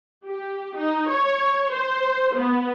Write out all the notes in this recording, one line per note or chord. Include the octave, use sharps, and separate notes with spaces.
G4
D#4
C#5
C5
B3